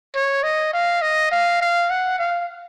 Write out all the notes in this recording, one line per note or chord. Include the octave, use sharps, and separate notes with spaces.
C#5
D#5
F5
D#5
F5
F5
F#5
F5